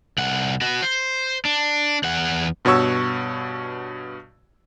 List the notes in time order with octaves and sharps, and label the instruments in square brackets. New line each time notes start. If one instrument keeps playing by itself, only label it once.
[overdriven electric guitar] C2 F#5
B3 F#4
C5
D4
E2 F#5
[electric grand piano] G2 B2 F#4 C#5 C#6 E6